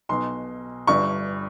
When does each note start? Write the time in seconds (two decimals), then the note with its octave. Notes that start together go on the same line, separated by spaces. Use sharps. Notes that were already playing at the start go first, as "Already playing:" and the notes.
0.09 B1 B2 C6
0.87 G1 G2 D3 C#6